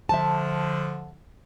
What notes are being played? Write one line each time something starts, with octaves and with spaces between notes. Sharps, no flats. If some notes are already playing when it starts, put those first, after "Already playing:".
D3 F3 E5 A5